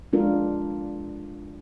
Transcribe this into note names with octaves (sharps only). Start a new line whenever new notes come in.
G#3 D4 F4 A#4